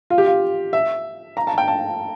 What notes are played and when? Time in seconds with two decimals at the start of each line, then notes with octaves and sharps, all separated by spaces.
0.10 F4
0.18 G4
0.26 F4
0.73 E5
1.37 A#5
1.47 A5
1.58 G5
1.68 A5